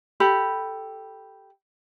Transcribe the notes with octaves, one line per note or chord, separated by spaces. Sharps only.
G4 A4 B5